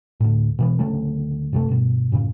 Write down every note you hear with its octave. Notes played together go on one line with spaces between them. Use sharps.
D2 A2
B2 E3 B3
D2 C#3 F#3 A3
F#2 C3 A3
G2 B2
F#2 A2 C#3